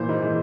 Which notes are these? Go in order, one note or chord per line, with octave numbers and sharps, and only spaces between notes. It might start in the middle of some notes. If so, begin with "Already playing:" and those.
Already playing: A#2 E3 C5
G#2
E3